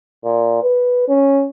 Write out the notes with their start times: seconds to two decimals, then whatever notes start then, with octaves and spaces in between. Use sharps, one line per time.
0.24 A#2
0.63 B4
1.08 C#4